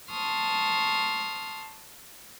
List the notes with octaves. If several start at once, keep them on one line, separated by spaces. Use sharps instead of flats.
A5 C6 C#6 D#6 F6